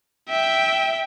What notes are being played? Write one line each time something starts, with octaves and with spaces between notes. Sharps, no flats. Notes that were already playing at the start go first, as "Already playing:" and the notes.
E5 G5